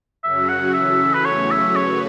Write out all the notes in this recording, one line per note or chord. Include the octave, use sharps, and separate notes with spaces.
F#2 C#3 F#3 C#4 F#4 E5
F#5
E3 C#4 A4 E5
B4
E2 C#3 F#3 A3 C#4 C#5
E5
F#2 C#3 A3 F#4 B4 C#5